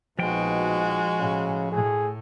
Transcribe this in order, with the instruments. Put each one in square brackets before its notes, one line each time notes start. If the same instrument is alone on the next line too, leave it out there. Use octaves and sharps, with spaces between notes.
[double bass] A#1 D#4 [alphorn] B2 [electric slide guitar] F3 G5 [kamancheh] G#3 F#4
[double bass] A2 [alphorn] C#3
[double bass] A2 [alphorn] G#4